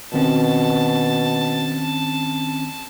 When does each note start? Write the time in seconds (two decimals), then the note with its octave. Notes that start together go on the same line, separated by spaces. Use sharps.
0.14 B2 D#3 C4 C#4 A5